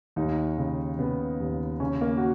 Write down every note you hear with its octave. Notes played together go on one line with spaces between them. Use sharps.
D#2 D#4
C#3
C#3 B3
D#2
C#3 C#4
A#3
F#4